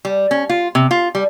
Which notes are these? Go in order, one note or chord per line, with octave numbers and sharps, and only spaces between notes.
G3
C#4
F4
C3
F4
G3